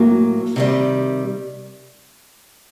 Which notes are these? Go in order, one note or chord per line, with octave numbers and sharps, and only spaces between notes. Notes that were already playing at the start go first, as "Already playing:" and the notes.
Already playing: A2 F#3 A#3
C3 D#3 G3